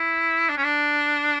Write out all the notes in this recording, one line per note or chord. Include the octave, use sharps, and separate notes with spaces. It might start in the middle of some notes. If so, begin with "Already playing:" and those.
Already playing: E4
D4
C#4
D4